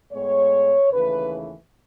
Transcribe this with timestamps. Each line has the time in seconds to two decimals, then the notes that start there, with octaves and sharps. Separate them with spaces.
0.12 A2 G#3 B3 C#5
0.91 D#2 C#3 E3 A3 B4